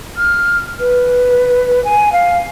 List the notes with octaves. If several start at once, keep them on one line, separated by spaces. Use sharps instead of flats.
F6
B4
G#5
F5